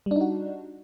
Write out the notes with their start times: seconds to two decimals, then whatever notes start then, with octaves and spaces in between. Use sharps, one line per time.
0.06 G3
0.11 D4
0.16 D#4
0.21 F#4